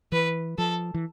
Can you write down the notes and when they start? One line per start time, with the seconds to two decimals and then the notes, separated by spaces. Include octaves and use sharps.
0.12 E3 B4
0.58 F3 A4
0.94 E3